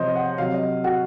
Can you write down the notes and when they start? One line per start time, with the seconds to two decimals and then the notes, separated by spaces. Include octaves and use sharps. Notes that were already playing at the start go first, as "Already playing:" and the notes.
Already playing: C3 F3 C5 C#5 D#5
0.15 F#5
0.38 C3 F#3 F5
0.54 D#5
0.84 F#4